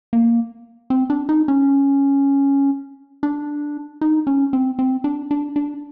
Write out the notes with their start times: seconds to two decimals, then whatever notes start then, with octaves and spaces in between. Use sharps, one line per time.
0.13 A#3
0.90 C4
1.10 D4
1.29 D#4
1.48 C#4
3.23 D4
4.01 D#4
4.27 C#4
4.53 C4
4.79 C4
5.04 D4
5.31 D4
5.56 D4